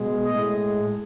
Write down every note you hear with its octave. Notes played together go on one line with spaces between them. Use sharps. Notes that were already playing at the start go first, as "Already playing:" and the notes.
Already playing: B2 G#3
A2 G#3 D#5